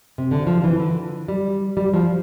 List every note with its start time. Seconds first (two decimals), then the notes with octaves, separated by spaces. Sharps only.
0.18 C3
0.31 D3
0.47 F3
0.64 E3
0.80 D3
1.28 G3
1.77 G3
1.94 F3